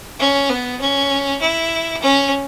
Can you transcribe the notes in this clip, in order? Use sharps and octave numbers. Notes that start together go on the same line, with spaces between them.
C#4
B3
C#4
E4
C#4